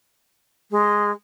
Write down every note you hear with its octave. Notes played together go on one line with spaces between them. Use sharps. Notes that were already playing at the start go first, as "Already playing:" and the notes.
G#3